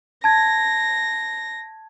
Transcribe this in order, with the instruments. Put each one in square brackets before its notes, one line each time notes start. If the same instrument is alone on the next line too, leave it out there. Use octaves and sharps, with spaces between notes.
[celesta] A5 G#6 [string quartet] A#6